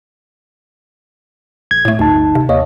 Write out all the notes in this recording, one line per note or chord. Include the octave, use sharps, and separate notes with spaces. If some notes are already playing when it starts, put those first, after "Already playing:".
A#1 G#6
A2 A3
G1 D2 D#4 A5
C3
D#2 C#5 D#5 F5